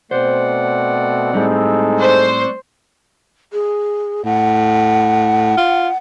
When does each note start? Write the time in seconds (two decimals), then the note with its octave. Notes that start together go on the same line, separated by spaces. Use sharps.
0.11 B2 A3 C4 C5 D5 F#5
1.34 A2 G3 G#3 C4 D#4 A4
1.99 C5 D5 C#6 F#6
3.53 G#4
4.25 A2 F#5
5.57 F4